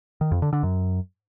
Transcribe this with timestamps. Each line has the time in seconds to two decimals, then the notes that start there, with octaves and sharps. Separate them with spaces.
0.21 D#3
0.32 F2
0.42 D3
0.53 D3
0.63 F#2